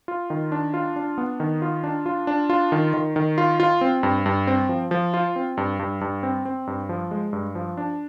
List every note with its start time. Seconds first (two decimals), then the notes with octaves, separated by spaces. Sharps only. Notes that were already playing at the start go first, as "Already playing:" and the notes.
0.08 F4
0.30 D#3
0.52 D4
0.74 F4
0.96 D4
1.18 B3
1.40 D#3
1.62 F4
1.84 D4
2.06 F4
2.27 D4
2.50 F4
2.72 D#3
2.94 D#3
3.16 D#3
3.38 F4
3.60 F4
3.81 C4
4.03 G2
4.26 G2
4.47 C4
4.69 F3
4.91 F3
5.14 F4
5.36 C4
5.57 G2
5.79 G2
6.01 G2
6.23 C4
6.45 C4
6.67 G2
6.89 F3
7.11 G#3
7.33 G2
7.55 F3
7.77 D4